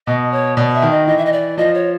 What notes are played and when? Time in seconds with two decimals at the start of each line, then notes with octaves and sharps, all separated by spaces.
0.07 B2 D#5
0.31 C#5
0.56 B2 D5
0.74 E5
0.82 D#3
0.91 D#5
1.07 E3 D#5
1.17 E5
1.25 D#5
1.32 D5
1.57 F3 D#5
1.74 C#5